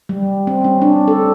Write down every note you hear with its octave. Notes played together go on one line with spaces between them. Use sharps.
G3
C4
C#4
D4
A4